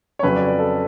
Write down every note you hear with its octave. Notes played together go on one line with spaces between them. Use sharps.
C#5
F2 C#3 F#3 B4
D5
D5
A4